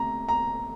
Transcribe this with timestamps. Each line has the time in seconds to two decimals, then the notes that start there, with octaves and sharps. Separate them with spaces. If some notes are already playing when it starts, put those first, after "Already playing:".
Already playing: C3 A3 A#5
0.29 A#5